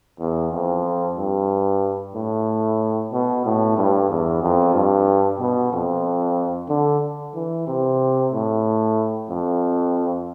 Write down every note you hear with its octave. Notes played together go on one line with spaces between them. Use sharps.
E2
F2
G2
A2
B2
A2
G2
E2
F2
G2
B2
F2
D3
E3
C3
A2
F2